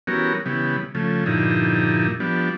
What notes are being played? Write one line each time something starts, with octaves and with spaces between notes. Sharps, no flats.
E3 G3 B3 C#4 F#4 A#4
C#3 E3 G3 B3
C#3 F3 A3
G2 A#2 D3 F3 D#4 E4
F3 G3 B3 D4